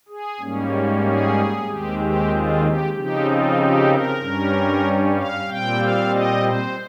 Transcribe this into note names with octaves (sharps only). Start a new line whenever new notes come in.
G#4
G#2 G3 A#3 C#4
G#4
D#2 D#3 G#3 C4 G4
G4
F4
G4
C#3 F3 C4 D#4 G4
F4
G4
A#4
G2 G3 C#4
F5
A#2 G3 C4 G5
F5
D#5
C5